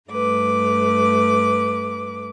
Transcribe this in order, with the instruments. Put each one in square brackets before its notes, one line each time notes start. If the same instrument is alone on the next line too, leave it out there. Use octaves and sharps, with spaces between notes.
[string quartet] G2 A3 B4 D6